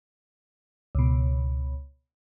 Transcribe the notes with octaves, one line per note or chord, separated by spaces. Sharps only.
C#2 B2